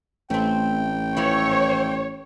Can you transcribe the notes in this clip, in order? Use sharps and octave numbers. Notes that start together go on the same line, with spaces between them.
A1 A3 C4 G5
E3 F3 E4 C#5